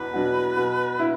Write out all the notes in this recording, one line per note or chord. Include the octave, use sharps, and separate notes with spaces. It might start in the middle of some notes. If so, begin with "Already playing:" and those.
Already playing: E2 B2 B4
B2 F#3
B2
E4